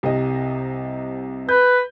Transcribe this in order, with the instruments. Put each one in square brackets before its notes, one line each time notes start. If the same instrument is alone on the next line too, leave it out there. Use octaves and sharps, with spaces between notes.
[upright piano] C2 C3 D#5
[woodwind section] B4 [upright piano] G6